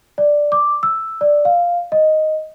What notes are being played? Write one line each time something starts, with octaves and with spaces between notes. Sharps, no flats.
D5
D6
E6
D5
F5
D#5